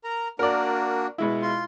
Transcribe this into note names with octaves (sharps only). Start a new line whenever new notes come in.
A#4 A#5
A#3 D4 F#4 A#4 D5
B2 G#3 E4
F4 C6